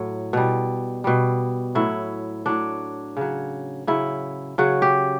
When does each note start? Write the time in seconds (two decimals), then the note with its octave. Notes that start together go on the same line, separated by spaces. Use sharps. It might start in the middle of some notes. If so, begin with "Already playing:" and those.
Already playing: A2 F#3
0.33 B2 G3
1.04 B2 G3
1.75 A2 F#3 E4
2.46 A2 F#3 D4
3.17 C#3 F#3
3.87 C#3 F#3 E4
4.58 C#3 F#3 F#4
4.82 G4